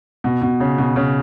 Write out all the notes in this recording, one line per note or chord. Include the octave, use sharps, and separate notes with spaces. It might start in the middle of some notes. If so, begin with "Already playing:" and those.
B2
B2
C#3
B2
C#3